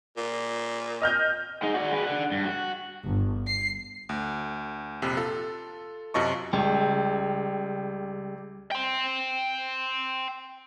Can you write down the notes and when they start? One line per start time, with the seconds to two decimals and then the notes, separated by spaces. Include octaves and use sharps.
0.17 A#2
1.02 D#5 F6 G6
1.62 G#3 D#4
1.74 F#4 D5
1.91 G#3 B4
2.04 D4 F#5
2.32 G2
2.44 F#4
3.04 G1
3.46 C7
4.09 D2
5.02 A#1 F2 C3
5.17 F4 A4
6.14 F#2 C3 F4 D#5 A5 C#6
6.53 C#2 G3
8.71 G5 C6